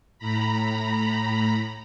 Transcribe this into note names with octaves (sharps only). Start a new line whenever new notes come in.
A2 A#5 B5